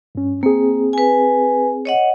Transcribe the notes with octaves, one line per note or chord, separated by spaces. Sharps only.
G2 C#4
A#3 C4 G#4
B4 G#5
C#5 D#5 F#5